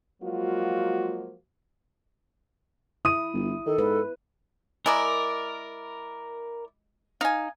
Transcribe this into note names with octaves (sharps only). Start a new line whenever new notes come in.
F3 F#3 G#3 A#3 F4 F#4
E4 D#6 D#7
G1
D#3 A4
G#2 B4
G#3 E4 A#4 D5 A#5
D#4 F5 G#5